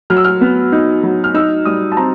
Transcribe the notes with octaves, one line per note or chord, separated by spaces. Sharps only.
F#3 F6
E6
F6
B3
D#4
F#3
F6
D#4 E6
G3 D#6
A5
C4 A#5